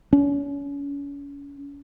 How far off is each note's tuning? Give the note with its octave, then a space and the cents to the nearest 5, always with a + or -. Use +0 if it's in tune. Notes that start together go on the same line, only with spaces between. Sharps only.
C#4 +35